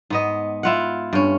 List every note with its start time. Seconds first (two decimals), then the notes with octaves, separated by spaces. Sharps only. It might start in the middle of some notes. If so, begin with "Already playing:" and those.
0.10 G#2 B3 D#5
0.63 E4 F4 F#5
1.13 G2 C#4